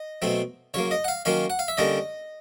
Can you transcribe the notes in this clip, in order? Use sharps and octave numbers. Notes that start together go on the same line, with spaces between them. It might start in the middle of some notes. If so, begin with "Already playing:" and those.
Already playing: D#5
B2 F#3 A3 C4
C#3 F#3 A#3 C#5
D#5
F#5
F5
D#3 F#3 A#3 C#4 F5
F#5
F5
E5
D3 G3 A#3 C#4 D#5